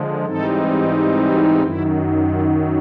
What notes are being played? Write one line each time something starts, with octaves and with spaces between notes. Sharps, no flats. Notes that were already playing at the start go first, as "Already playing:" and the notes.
Already playing: D3 F3 G#3
G#2 E3 G3 C4 D#4 A4
G4
F#4
F#2 D#3 F#3 E4
F4